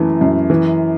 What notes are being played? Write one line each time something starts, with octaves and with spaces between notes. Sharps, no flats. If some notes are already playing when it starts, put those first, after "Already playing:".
Already playing: F#2 E3 A3
F#2
E3